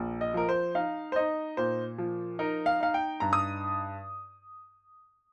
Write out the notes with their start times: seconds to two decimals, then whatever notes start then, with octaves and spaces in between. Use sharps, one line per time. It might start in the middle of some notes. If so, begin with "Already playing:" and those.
Already playing: A#1
0.21 D#5
0.34 F3 A#4
0.49 C5
0.75 D#4 F5
1.12 C5
1.16 D#4 D#5
1.57 A#2 C5
1.98 F3
2.39 D#4 A#4
2.66 F5
2.80 D#4 F5
2.94 G5
3.20 G2 A#5
3.33 D#6